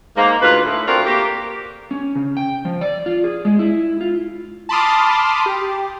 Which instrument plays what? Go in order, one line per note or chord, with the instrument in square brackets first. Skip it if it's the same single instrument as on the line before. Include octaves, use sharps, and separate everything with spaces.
[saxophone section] G#2 A#3
D2 F4 B4
A2
C4 D4 F4 F#4 A#4
A#3 G4
[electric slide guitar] C#4
C#3
G5
F3
D5
F4
G#4
G#3
E4
F4
[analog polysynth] A5 B5 C6 D6 D#6 F6
G4